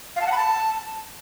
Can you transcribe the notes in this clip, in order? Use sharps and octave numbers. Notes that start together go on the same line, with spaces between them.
F5
A5
F#5
B5
A5